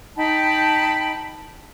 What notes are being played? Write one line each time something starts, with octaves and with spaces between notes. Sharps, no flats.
D#4 G5 A5 B5